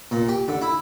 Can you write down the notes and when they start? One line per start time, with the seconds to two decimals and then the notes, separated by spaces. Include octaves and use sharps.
0.11 A#2
0.29 G4
0.48 D3
0.62 E4